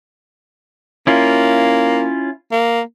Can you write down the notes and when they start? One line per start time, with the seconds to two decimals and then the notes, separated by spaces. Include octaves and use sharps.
1.07 A#3 C#4 E4 F4
2.52 A#3